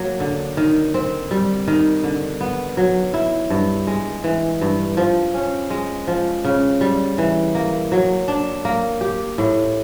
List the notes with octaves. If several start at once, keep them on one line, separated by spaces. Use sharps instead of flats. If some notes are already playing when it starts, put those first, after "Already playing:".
Already playing: F#3 A#3
D3
D#3
C4
G3
D#3
D3
B3
F#3
E4
G2
G#3
E3
G2
F3
C#4
G#3
F3
C#3
G3
E3
A#3
F#3
D4
A#3
G4
A2